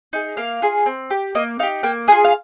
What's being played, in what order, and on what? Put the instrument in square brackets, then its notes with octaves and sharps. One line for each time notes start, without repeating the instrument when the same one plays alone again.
[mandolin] D#4 G#4
A#3 F5
F4 G#4
C4
G4
A#3 D#5
D#4 F5
G4
A#3 G5
G#4 G#5
F4
F5